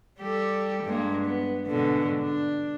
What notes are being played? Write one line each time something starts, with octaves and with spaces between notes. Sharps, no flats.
G3 G4 A4
G2 G#3 A#3
B3
G#2 B2 D3
D4